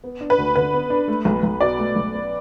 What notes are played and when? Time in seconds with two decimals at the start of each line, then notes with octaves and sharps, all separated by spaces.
0.04 B3
0.21 D4
0.30 B4
0.38 D2
0.56 D3 B4
0.73 B3
0.90 D4
1.08 A3
1.25 B1
1.43 B1
1.61 B2 D5
1.79 A3
1.96 B1
2.14 B3